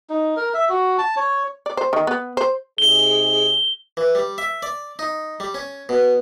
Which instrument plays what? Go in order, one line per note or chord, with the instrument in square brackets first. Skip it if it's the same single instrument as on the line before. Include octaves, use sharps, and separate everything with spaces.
[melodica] D#4
A#4
E5
F#4
A5
C#5
[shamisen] D5
C5
D#3
B3
C5
[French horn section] C3 D#4 G#4 [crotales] G7
[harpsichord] E3
G3
E5
D5
D#4
G3
C#4
B2